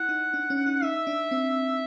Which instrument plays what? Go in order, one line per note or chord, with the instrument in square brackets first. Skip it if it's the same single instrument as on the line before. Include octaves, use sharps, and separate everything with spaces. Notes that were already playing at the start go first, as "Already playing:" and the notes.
Already playing: [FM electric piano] E4 [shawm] F#5
[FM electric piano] D#4
D4
C#4
D#4
[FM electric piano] D#4 [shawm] E5
[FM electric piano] D4
C4